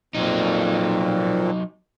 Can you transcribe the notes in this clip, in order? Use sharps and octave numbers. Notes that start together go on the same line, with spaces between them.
F2 A#2 F#3 D#4